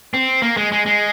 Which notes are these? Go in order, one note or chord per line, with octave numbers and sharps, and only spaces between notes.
C4
A#3
G#3
G#3
G#3